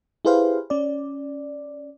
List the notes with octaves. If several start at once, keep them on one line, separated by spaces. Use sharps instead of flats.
E4 G4 G#4 B4 C5 F5
C#4 D5